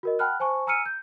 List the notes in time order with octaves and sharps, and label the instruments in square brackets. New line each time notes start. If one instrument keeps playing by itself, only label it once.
[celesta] F#4 A#4 D#5
F#5 G5 A5 B5 F6 F#6
C5 G#5 A5 C#6
G#5 A#5 E6 F6 C#7 D#7
G6